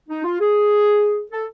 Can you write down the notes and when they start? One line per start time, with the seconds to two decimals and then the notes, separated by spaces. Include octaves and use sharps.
0.09 D#4
0.24 F4
0.39 G#4
1.31 A4